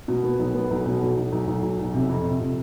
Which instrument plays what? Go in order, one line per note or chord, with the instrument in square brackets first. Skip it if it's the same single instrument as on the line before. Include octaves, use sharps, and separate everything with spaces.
[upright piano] B2
B3
B1
B3
B1
B2
B1
B1
B1
B1
B1
B1
C3
F2
C3
C3